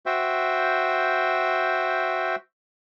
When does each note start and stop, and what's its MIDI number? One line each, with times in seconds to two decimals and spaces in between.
0.06 2.36 66
0.06 2.36 72
0.06 2.36 76
0.06 2.36 79